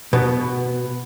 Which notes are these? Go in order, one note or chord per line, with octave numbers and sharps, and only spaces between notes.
B2 B3